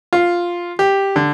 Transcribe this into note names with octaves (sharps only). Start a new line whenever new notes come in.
F4
G4
D3